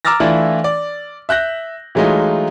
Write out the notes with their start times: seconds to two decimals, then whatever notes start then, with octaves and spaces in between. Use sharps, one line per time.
0.05 A#5 D6 E6 F6 A6 A#6
0.20 E3 A3 D4 E4 F4
0.64 D5
1.29 E5 F#6 G6 A#6
1.95 E3 F#3 G#3 A3 D#4 F4